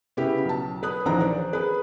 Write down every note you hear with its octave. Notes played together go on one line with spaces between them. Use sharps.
C#3 B3 E4 G4
B1 A5
B4 D#6 F#6
A#1 D#3 E3 D4 C5 A#5
C5 D5
G#4 B4